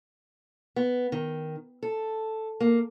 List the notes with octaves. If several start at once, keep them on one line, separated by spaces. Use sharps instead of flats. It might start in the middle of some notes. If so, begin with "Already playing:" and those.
B3
D#3
A4
A#3